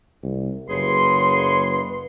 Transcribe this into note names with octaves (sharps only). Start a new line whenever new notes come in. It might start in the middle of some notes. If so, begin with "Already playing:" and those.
C2
F#1 G#4 B4 C#5 C6